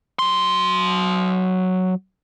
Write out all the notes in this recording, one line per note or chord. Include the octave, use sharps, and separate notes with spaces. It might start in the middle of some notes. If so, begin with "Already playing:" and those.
F#3 C6